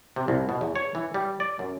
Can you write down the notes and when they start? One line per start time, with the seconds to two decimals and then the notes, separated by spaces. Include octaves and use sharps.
0.16 C3
0.28 C2
0.49 B2
0.61 E2
0.75 C#5
0.95 E3
1.14 G3
1.40 D5
1.59 F#2